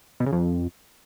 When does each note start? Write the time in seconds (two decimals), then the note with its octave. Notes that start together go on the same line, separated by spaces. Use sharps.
0.20 B2
0.26 C#3
0.32 F2